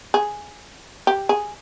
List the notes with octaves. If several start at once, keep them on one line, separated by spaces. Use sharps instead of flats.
G#4
G4
G#4